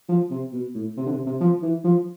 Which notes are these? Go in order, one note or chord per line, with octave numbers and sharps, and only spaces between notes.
F3
C3
B2
A2
C3
D3
C3
C3
F3
E3
F3